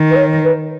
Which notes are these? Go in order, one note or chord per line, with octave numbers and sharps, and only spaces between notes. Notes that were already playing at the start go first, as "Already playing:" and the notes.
Already playing: D#3
B4
C#5
B4